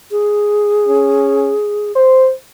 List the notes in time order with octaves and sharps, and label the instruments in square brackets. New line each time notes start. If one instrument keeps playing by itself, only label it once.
[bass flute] G#4
[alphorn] C#4
C5